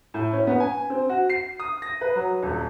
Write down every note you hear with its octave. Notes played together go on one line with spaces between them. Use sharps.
A2
C#4
B3
G#5
C4
F#4
C7
D#6
A#6
B4
F#3
D#1